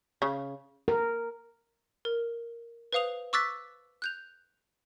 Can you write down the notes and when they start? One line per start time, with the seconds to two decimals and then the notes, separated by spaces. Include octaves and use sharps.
0.22 C#3
0.88 A#4
2.05 A#4
2.92 B4 C5 F5 D#6 F7
3.33 C#6 D6 E6 F#6 A6 B6
4.02 F#6 G6 F7